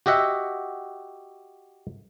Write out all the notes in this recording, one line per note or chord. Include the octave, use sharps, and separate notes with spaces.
F#4 G4 D#5 E5 F#5